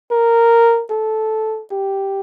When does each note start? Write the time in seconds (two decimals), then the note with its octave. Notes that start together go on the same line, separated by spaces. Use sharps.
0.11 A#4
0.91 A4
1.72 G4